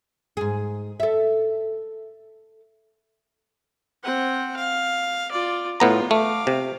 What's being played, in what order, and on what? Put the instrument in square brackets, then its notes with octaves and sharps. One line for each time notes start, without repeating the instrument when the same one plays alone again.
[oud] G#2 G#4
A4 E5
[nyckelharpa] C4 F#5
F5
F4 D5
[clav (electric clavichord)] A2 B3 A#5 [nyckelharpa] F4
[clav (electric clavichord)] A3 [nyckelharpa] F5 D6
[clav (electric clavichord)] C3